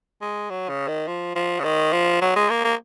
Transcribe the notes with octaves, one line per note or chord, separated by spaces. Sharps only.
G#3
F#3
C#3
D#3
F3
F3
C#3
D#3
F3
F#3
G#3
A#3
A#3